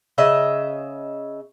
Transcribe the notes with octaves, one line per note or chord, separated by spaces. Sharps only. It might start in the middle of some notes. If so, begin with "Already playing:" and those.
C#3 D#5 E5